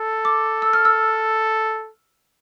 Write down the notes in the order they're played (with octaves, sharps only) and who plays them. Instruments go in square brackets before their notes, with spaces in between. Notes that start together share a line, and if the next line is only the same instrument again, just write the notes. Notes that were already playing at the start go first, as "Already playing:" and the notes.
Already playing: [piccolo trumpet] A4
[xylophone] D6
E6
F6
E6